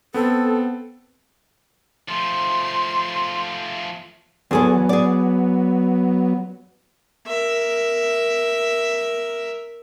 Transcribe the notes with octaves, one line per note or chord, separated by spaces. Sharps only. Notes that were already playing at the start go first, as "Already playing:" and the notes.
B3 C4 A4
F3 A3 C6
E2 F#3 B3 G#4 A4
G#4 D5
A#4 E5